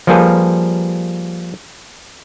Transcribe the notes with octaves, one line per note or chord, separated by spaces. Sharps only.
F3 G3 A#3 G#4 A4 B4